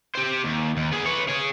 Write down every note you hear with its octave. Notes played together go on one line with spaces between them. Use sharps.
G4 C5
D#2
D#2
B3 G#4
B4 C#5
G#4 C#5